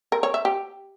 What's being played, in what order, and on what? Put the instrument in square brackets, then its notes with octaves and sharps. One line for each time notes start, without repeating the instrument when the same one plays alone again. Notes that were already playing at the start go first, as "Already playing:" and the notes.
[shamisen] A#4
C#5
E5
G4